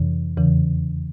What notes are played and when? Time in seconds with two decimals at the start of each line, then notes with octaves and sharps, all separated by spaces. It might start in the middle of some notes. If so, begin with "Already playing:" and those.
Already playing: F2 C3 E3
0.37 E2 C#3 E3